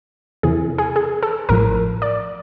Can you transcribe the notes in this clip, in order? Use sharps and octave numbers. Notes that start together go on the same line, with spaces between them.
E2 C3 E3 G#4
G#4
G#4
A4
A1 A2 F3 A#4
D5